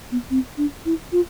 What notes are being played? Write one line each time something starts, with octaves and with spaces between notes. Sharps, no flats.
B3
C4
D4
E4
F4